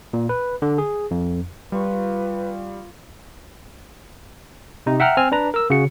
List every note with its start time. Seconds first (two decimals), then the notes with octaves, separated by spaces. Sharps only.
0.13 A#2
0.29 B4
0.62 D3
0.78 G#4
1.11 F2
1.72 G3 F4 B4 C#6
4.86 C3 D#4
5.00 E5 F#5 G5 A#5 F6
5.17 C4 G#5 F6
5.32 D4 B4 A#5
5.54 A#4 E6
5.70 C#3 F#4 C#7